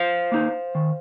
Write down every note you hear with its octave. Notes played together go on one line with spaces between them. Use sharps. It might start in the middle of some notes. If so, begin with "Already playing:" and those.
Already playing: C5 F5
A#3 D#4
D#3